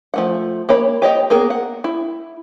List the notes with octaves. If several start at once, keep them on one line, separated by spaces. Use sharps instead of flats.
F3 A3 F#5
A#3 C#5 B5
G4 C#5 D#5 G5
A#3 B3 G#4 A#4
F#5
E4